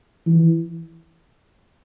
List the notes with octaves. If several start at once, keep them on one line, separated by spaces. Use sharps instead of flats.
E3